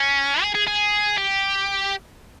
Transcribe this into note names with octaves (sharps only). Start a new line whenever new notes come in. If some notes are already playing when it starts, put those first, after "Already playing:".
Already playing: C#4
G#4
G#4
G#4
G4